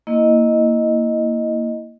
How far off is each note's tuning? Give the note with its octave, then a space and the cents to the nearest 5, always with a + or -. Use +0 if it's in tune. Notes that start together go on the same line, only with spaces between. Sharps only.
A#3 +0 E4 -15 D#5 +0